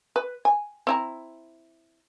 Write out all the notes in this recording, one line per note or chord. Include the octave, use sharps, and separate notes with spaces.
B4
G#5
C4 E4 A#5